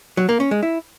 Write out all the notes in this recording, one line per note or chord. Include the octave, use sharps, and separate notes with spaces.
F#3
A#3
C#4
G#3
E4